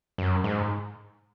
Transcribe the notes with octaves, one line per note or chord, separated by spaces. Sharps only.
F#2
G#2